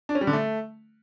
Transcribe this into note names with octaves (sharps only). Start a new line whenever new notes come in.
D4
C#4
G3
D3
A3